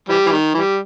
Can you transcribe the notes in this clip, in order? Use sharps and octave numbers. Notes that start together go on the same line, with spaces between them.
E3 G3
E3
D#3
E3 G3